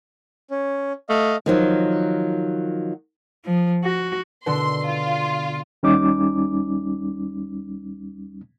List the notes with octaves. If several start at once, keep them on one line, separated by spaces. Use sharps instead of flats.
C#4
A3 D#5 F5
D#3 F3 F#3
F3
F#4
B2 D3 C6 E6
F4
D#2 G3 C#4 D#4 D6